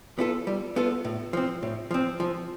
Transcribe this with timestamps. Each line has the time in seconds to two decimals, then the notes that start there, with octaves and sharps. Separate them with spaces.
0.19 B3 F4 A4
0.47 G3
0.76 B3 F4 A4
1.05 A2
1.33 F3 C4
1.63 A2
1.91 F3 C4
2.20 F3